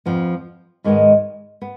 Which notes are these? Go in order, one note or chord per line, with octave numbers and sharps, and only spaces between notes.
F2 F3 B3
G#2 D#3 G#3 B3
B3